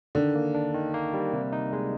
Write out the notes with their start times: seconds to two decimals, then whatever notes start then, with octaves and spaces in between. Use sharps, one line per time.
0.15 D3 D#3
0.35 A#3
0.54 D4
0.74 D#3
0.94 A#3
1.14 G3
1.33 C3
1.53 D#4
1.73 G#3